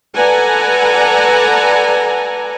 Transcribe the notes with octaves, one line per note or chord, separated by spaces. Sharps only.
A4 B4 D5 F#5 G#5 A#5